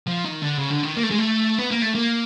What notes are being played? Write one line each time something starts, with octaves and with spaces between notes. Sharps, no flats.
F3
D#3
D3
C#3
D3
D#3
A#3
A3
G#3
A3
B3
A#3
A3
A#3